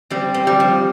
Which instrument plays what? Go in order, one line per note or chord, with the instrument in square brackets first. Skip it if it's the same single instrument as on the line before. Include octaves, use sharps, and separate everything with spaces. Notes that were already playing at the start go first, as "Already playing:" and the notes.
[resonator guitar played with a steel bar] G3 [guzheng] C4
[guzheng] C4
[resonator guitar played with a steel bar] G3
[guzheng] F3